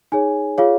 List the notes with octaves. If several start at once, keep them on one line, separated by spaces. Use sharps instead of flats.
D#4 G#4 C#5 G#5
F4 G#4 C#5 F5